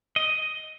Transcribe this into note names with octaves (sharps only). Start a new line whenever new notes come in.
D#5